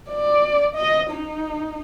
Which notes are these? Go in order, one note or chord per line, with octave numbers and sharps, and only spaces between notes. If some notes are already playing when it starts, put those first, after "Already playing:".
D5
D#5
D#4